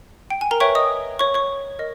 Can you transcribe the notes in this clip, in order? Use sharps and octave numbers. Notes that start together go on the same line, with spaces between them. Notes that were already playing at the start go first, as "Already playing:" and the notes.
G5
G#5
A#4 A#5
B4 C#5 E5 G5 C#6
D#5 D#6
C#5 C#6
C#5 C#6
A#4 D#5